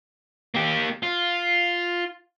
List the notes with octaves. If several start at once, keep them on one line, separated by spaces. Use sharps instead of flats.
A#3 G4
F4